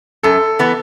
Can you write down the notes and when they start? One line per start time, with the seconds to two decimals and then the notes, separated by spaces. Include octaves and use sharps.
0.23 F#2 A4
0.59 E3 B3